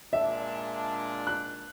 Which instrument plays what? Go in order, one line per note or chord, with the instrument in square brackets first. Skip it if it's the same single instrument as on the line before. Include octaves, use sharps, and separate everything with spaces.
[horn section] A#2 G#3 D4 [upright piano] E5
[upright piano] F#6